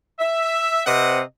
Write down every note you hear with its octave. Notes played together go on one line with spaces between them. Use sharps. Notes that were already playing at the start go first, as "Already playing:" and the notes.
E5
C3 C4 B4 D#5 F#5